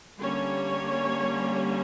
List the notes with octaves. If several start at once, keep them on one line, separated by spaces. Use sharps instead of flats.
D3 G3 A#3 C#4 C#5